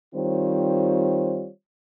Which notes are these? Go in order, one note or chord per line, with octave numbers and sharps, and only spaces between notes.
D#3 G3 C4 F4 C5 C#5